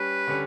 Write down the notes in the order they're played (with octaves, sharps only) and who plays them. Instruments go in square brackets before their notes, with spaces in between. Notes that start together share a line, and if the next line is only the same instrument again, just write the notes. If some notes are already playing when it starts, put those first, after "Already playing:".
Already playing: [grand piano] G3 C#4 [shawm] B4
[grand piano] D3 G3 C#4